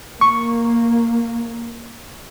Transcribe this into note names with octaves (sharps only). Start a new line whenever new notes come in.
A#3 C#6